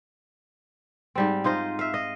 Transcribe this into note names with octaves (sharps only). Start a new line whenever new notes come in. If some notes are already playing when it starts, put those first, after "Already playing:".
G#2 G3 C4
D#4 F4 C5 D#5
E5 F5
D#5